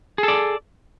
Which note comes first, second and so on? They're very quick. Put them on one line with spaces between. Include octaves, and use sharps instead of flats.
G#4 A4 D5